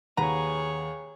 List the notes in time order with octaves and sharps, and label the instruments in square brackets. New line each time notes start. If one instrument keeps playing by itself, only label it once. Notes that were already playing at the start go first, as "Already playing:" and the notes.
[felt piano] D#2 F#5 [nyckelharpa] G#4 C#5 [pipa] B4 A#5